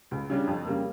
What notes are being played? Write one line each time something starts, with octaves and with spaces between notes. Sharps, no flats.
C#2
C#3 G3 D4
F2
C#3 G3 A#3